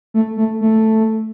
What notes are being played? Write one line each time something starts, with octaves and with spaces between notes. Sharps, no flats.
A3
A3
A3